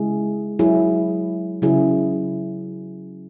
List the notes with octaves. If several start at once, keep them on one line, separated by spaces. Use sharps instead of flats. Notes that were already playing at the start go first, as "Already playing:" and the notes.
Already playing: C#3 G#3 E4 G#4
F#3 E4 G#4
C#3 F#3 E4 G#4